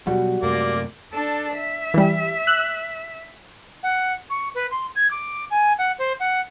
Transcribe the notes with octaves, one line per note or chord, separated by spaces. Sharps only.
B2 F#3 G3 F#4
F#2 C3 A3 A#3 D5
D4 A4
E5
E3 G3
E6 F#6
F#5
C#6
B4
C6
G#6
D6
G#5
F#5
C5
F#5